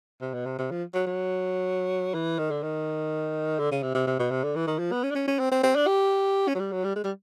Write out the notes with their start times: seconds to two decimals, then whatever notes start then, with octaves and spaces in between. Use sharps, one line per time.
0.22 C3
0.34 B2
0.46 C3
0.59 C3
0.71 F3
0.94 F#3
1.07 F#3
2.14 E3
2.39 D#3
2.50 D3
2.63 D#3
3.59 D3
3.71 C#3
3.83 C3
3.94 C3
4.07 C3
4.19 B2
4.31 C3
4.43 D3
4.56 E3
4.67 D#3
4.79 F3
4.92 B3
5.03 C#4
5.11 D4
5.15 C#4
5.27 C#4
5.39 C4
5.51 C4
5.63 C4
5.76 D4
5.87 G4
6.48 C#4
6.55 F#3
6.59 G3
6.72 F#3
6.84 G3
6.95 G#3
7.04 G3